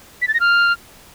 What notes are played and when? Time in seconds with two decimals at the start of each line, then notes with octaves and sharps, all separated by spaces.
0.22 B6
0.28 A6
0.34 A#6
0.40 F6